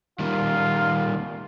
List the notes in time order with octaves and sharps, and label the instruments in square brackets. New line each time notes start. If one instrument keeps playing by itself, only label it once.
[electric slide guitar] D#3 G3 A#3 [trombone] F4